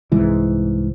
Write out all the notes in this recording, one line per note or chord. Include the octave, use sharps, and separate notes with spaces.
C2 G#2 E3